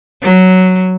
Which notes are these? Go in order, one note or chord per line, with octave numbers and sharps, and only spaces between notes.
F#3